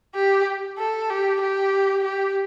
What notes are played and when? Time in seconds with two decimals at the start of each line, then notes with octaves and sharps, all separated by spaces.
0.15 G4
0.78 A4
1.10 G4
1.42 G4
2.04 G4